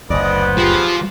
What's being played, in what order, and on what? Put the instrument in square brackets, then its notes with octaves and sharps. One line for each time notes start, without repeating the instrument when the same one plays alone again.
[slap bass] F#1 D2 [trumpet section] B3 B4 C5 [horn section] D5 D#5
[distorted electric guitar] F3 [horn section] G4 G#4